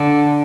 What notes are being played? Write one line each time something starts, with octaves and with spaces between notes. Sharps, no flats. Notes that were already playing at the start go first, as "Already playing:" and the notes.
Already playing: D3